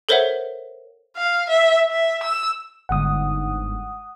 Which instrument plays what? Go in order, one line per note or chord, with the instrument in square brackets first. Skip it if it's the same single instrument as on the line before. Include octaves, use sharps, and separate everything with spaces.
[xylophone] A4 A#4 C5 C#5 E5 F#5
[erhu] F5
E5
E5
E6
[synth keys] G1 G#2 D3 [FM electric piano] F#5 D#6